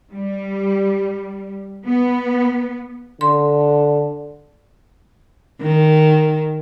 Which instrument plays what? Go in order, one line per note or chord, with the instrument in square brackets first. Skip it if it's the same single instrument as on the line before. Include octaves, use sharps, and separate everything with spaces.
[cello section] G3
B3
[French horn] D3 [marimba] C6
[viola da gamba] D#3